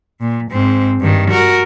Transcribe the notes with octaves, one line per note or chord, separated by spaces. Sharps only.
A#2
G#2 C4
G2 D#3
F#4 A#4